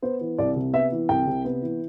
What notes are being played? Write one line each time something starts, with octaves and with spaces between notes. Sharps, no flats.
B3 C5
E3
C2 D5
C3
B3 E5
E3
C2 G5
C3
B3
E3